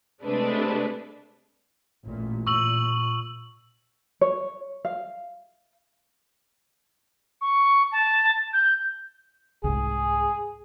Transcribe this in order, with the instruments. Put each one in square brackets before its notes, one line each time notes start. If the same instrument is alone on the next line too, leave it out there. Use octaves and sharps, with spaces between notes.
[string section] C3 G#3 A3 D4 B4
[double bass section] A1 A#2
[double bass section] A#2 [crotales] C#6 E6 F#7
[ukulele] C#5
F5
[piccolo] C#6
A5
G6
[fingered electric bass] C2 G#2 [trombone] G#4